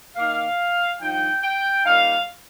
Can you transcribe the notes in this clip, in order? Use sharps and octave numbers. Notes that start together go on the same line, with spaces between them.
D#3 A#3 D#4 F5
G2 F3 D#4 G5
G5
A#2 G3 D#4 F5